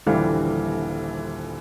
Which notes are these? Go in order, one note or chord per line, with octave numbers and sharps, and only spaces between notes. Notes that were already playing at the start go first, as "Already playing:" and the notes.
D#1 A#1 D3 E3 G3 F5